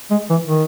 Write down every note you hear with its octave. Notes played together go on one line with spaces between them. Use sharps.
G#3
E3
D#3